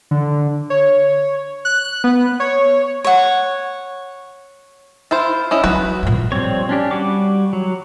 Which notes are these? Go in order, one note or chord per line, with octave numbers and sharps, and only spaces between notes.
D3
C#5
F#6
B3
C#5
C#5 F#5
E4 F4 C5
C#4 E4 D#5
F#3 C#4 F#4 B4
G2 A#2
F3 G3 C4 C#5
C#4 D4 G4
G3 F#4 D6
F#3